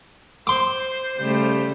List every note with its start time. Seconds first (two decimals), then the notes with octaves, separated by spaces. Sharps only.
0.47 C5 C6 D6
1.17 C#3 G3 A3